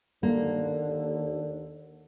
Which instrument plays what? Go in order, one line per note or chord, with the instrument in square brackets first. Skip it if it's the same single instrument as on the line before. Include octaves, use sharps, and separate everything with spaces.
[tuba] D#2 [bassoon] D3 [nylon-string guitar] A#3